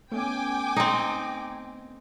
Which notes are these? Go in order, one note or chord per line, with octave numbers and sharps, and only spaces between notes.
A3 B3 C#4 G5 G#5 D6
C4 D#4